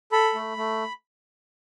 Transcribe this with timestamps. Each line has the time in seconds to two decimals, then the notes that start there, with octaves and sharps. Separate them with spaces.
0.12 A4 B5
0.35 A3
0.57 A3